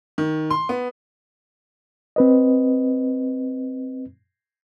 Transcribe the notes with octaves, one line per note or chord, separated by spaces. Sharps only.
D#3
C6
B3
C4 B4 D#5